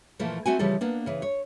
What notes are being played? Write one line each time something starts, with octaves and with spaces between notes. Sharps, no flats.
A#2 E3 F3 A3 A#3
A3 C4 F#4 G#5
C#3 E3 F3 G3 A4
A#3 B3 D4
C#3 E3
C#5